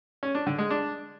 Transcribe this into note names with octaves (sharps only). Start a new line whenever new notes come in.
C#4
D4
D3
G#3
D4